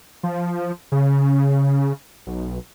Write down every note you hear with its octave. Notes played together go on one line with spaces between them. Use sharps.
F3
C#3
B1